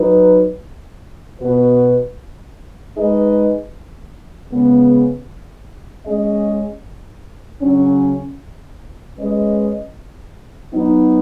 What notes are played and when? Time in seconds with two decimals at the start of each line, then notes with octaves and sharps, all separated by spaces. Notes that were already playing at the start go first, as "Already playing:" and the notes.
Already playing: F#3 D#4 B4
1.39 B2 B3 F#4 B4
2.96 G#3 D#4 G#4 B4 D#5
4.51 C#3 G#3 B3
6.06 G#3 C#4 G#4 D#5
7.62 C#3 F#3 C#4
9.18 G#3 C#4 B4 D#5
10.73 F#3 B3 D#4